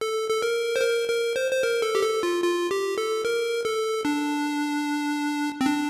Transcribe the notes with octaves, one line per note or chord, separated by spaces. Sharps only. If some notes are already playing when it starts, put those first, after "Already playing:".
A4
A4
A#4
C5
A#4
A#4
C5
C5
A#4
A4
G4
A4
F4
F4
G4
A4
A#4
A4
D4
C4
D4